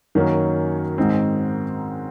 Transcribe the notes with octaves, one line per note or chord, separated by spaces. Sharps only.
F#2 D#3 F#3 A#3 C#4
G#2 D#3 G#3 C4